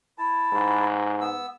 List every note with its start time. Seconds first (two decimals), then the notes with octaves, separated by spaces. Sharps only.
0.18 E4 A5
0.53 G#2
1.21 B3 E6